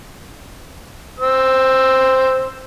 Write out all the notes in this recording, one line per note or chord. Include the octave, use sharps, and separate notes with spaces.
C5 E6